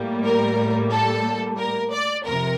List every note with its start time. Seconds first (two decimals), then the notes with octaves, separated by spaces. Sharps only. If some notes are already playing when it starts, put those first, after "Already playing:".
Already playing: A2 G3 A#3
0.24 A#4
0.91 A4
1.59 A#4
1.93 D5
2.26 F2 C3 A#4